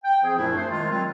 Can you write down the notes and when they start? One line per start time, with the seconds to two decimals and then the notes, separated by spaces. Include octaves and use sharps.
0.04 G5
0.23 F3 C4 G#4
0.37 F#2 A#2 F3 A3 D4 E4
0.56 A3 C5
0.70 D#3 G#3 F4
0.90 F#3 G3 C4 F4